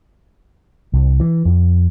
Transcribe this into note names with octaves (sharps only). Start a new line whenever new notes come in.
C2
E3
F2